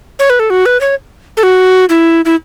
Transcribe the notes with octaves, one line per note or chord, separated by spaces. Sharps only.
C#5
B4
A4
F#4
B4
C#5
A4
F#4
E4
E4